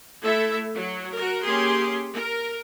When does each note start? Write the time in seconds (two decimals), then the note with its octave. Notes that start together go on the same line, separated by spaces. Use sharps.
0.21 A3 E4 A4 E5
0.74 F#3
1.14 F#4 A#4
1.44 A#3 C#4 G4 G#4 C6
2.15 A#4